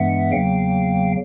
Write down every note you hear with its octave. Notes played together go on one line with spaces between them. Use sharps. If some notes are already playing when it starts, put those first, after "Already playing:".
Already playing: G2 E3 G#3 B3 E5 F#5
E2 C#3 F#3 A#3 F5 G5